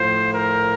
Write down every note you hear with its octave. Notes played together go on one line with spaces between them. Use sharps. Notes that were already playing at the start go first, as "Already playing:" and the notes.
Already playing: A2 F3 C5
A#4